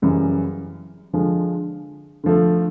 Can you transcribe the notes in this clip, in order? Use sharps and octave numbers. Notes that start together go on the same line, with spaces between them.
F#2 C#3 E3 G3
D3 F3 G#3
D3 F3 A3